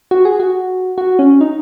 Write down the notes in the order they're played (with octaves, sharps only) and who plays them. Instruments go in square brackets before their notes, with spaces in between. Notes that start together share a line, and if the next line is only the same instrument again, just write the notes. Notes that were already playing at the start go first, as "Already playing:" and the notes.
[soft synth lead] F#4
G#4
F#4
F#4
C#4
D#4